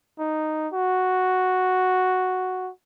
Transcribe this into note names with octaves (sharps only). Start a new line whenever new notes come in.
D#4
F#4